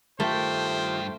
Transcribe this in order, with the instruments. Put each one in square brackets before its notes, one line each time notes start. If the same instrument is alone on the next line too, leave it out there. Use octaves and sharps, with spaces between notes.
[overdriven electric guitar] G2 G5 [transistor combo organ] D#3 F4 G4 [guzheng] A3 [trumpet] C5